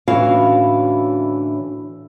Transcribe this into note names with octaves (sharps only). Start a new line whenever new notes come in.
A2 D3 E3 C#4 F#4 F5